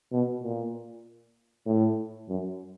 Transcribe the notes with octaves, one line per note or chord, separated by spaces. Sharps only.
B2
A#2
A2
F#2